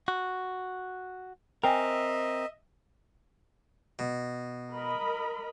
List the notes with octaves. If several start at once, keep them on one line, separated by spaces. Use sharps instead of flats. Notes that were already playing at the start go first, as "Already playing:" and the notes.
F#4
C4 A#4 D#5 E5 G5 G#5
B2
A#4 D#5 B5